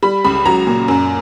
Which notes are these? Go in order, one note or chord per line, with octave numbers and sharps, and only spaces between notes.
G3 B5
C#2 B5
F#3 A#5
A#2
F#2